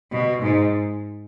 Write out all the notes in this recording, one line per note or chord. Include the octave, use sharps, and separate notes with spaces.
B2
G#2